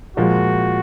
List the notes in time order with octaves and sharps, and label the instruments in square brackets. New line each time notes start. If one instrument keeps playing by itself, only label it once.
[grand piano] A#2 F3 G#3 [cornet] F#4